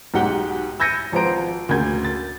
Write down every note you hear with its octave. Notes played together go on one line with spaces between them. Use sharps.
B1 G#2 G4 F#5 G7
E6 G6 G#6 A#6 C#7 D#7
G#1 F3 B4 C5 A#5 D7
D2 C#3 A#3 G6 G#6
A6